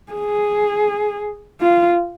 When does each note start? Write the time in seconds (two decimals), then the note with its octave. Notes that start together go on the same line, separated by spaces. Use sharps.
0.13 G#4
1.61 F4